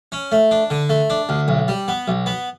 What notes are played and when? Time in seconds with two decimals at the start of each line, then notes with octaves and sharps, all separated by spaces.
0.12 C#4
0.32 A3
0.51 D4
0.70 D3
0.89 A3
1.10 D4
1.29 D2
1.48 B1
1.68 G3
1.88 B3
2.08 B1
2.26 B3